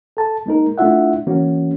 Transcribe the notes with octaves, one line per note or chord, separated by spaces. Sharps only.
A4 A5
G#3 A#3 D#4 A#4
A3 D4 E4 F4 E5 F#5
E3 A#3 C#4 F#4